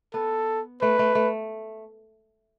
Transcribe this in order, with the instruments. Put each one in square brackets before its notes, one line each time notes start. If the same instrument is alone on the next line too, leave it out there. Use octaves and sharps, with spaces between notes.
[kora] B3 [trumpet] A4
[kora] A3 [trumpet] B4
[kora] A3
A3